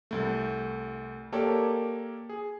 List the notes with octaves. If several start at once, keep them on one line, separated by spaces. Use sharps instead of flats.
C2 A3
A#3 G4 A4 A#4 C#5 D5
G#4